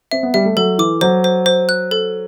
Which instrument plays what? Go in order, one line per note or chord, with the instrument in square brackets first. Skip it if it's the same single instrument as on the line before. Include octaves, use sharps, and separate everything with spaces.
[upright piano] C4 [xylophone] E5
[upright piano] B3
[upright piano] G3 [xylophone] E5
[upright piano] A3
[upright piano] F#3 [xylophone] A4
[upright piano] E3 [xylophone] D6
[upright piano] F#3 [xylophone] C5
[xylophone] C5
C5
F#6
A4